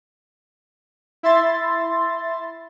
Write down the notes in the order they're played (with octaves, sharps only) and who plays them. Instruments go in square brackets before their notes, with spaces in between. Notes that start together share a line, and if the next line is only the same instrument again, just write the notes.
[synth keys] E4 E5 C6 A6